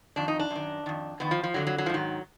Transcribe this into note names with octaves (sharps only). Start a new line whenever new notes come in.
F2 D#3 D4
D#4
D4
F#2
D#3
F2 D#3
F2 D#3 B3
F3
F3
F2 D3 F#3
F#3
F#3
F3
G#2 D#3 F#3